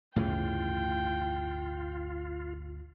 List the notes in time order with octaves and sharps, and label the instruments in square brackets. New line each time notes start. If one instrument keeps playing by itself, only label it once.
[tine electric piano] G1 D2 [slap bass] A2 C#3 E3 [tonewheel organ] F4 [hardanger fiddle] G5